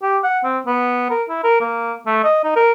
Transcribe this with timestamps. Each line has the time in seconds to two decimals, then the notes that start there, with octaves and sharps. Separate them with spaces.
0.02 G4
0.23 F#5
0.44 C4
0.66 B3
1.10 A#4
1.29 E4
1.44 A#4
1.61 A#3
2.06 A3
2.24 D#5
2.44 D#4
2.56 A#4